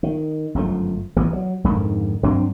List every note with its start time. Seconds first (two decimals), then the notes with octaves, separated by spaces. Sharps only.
0.03 D#3
0.55 G1 F#2 F3 A3
1.16 A1 E3 B3
1.33 F#3
1.64 F2 G#2 D3 D#3
2.23 G2 F#3 C4 D4